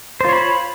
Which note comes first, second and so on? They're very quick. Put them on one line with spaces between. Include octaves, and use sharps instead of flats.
C5 F4 C#5 B5